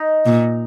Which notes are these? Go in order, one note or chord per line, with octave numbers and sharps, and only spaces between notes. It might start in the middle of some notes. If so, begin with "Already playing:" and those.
Already playing: D#4
A#2